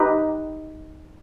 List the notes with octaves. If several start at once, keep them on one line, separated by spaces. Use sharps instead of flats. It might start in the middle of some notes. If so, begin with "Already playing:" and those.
Already playing: D#4 G4 B4